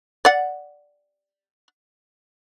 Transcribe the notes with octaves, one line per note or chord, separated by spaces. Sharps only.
D5 F#5